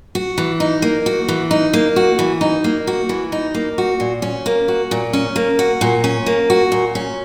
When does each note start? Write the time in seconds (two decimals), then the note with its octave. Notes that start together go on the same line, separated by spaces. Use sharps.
0.15 F#4
0.38 E3
0.60 D#4
0.82 A#3
1.06 F#4
1.28 E3
1.51 D#4
1.73 A#3
1.96 F#4
2.19 E3
2.41 D#4
2.64 A#3
2.87 F#4
3.09 E3
3.32 D#4
3.55 A#3
3.78 F#4
4.00 A#2
4.22 C#4
4.46 A#3
4.68 F#4
4.91 A#2
5.13 C#4
5.36 A#3
5.59 F#4
5.81 A#2
6.04 C#4
6.26 A#3
6.50 F#4
6.72 A#2
6.95 C#4